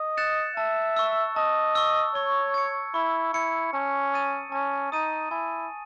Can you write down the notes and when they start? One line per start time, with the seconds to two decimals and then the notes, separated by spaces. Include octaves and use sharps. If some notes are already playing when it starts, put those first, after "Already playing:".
Already playing: D#5
0.17 F#6 A6 C#7 E7
0.57 E5 A5
0.96 C#6 E6
1.36 D#5 A5
1.75 C#6 E6
2.15 C#5 C#6
2.54 G#6 C#7
2.94 E4 C#6
3.33 E4 G#6 C#7
3.73 C#4 A5
4.13 D#6 A6 D#7
4.52 C#4 A5
4.92 D#4 D#6 A6 D#7
5.31 E4 G#5